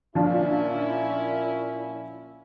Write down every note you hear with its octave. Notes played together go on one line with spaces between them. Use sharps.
A#2 F3 C#4 D4 E4 F4